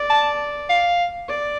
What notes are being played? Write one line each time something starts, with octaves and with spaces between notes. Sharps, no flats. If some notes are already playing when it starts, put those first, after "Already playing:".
Already playing: D5
A5
F5
D5